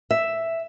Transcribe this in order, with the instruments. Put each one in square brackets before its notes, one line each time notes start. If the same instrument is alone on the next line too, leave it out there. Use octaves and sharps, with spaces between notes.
[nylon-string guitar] E5